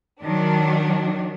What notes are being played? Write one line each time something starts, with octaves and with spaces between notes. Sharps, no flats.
D#3 F#3 D4